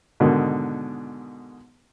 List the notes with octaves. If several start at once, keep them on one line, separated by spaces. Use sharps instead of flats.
G#2 B2 D3 D#3